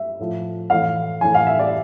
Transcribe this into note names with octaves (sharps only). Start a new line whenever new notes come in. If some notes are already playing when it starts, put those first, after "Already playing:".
Already playing: E5
A2 F3
A2 E3 F5
A2 E3 G#5
F5
E5
D5